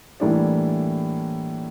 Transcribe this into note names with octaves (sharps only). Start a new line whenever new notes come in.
A2 E3 G3 A#3 D4